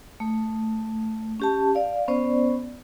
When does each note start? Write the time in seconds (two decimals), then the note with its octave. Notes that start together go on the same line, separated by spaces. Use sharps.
0.20 A3
1.40 C#4 G4 A5
1.75 D5 F5
2.08 B3 C#4 C5 D5